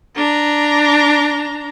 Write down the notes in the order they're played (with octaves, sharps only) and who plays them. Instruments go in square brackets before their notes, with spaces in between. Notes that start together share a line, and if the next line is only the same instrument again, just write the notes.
[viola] D4 A#5